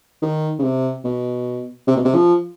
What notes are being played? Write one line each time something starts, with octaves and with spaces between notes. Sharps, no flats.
D#3
C#3
C3
B2
C3
B2
C3
F3